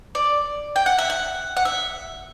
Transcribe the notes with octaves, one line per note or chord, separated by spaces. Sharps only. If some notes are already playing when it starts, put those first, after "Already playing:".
D5
G5
F#5
E5
F#5
F#5
E5